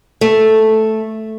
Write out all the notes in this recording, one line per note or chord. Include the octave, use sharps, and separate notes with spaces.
A3